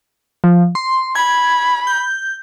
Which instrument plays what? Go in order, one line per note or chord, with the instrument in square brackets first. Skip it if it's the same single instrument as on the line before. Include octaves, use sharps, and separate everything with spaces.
[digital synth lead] F3
C6
[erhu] B5 [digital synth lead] G#6
[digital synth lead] G6